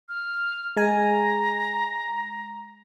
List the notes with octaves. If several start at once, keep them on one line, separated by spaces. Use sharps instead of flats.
F6
G#3 G#5 A#5